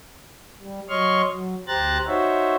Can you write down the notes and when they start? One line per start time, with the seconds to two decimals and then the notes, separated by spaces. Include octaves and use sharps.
0.61 G3
0.89 F#3 C#5 D#5 C6 C#6 F6
1.31 F#3
1.68 D2 G4 C5 A#5 F#6 A6
2.07 D#4 F#4 C5 C#5 E5